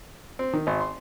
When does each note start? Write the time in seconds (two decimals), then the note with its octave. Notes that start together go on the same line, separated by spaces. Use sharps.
0.39 C4
0.53 D#3
0.67 G#1
0.81 C6